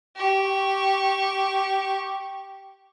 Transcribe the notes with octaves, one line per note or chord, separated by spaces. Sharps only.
G4 C#6